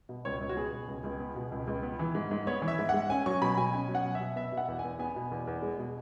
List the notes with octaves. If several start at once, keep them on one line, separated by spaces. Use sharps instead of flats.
B2
C#2 C#5
C#2
F#4
B3 G#4
B2
C#2
C#2
B3
B2
C#2
C#2
B3
E3
G#2
G#2
B3 C#5
E3
E5
G#2
F#5
G#2
C#4 G#5
F#3 C#6
B2 B5
B2 G#5
C#4 G#5
F#3
F#5
B2
E5
B2
B3 E5
B2
F#5
E2
G#5
E2
B3 G#5
B2
E2
E2
G#3
B2